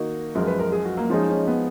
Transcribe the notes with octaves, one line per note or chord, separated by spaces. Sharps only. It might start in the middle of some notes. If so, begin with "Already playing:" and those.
Already playing: D#3 A#3 D#4 F#4
F#2 F3 G#3 A#4
B4
A#4
G#4
F#4
A#3
F3 G#3 C#4 D#4 G#4
C#4
B3